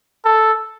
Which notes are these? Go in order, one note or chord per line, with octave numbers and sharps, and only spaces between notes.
A4